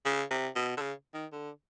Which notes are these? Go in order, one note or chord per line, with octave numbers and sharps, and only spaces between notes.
C#3
C3
B2
D3
C#3
D#3
D3